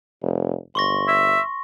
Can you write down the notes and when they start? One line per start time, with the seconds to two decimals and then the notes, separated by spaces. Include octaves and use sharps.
0.22 F1
0.75 G1 C6 C#6 A#6
1.08 E5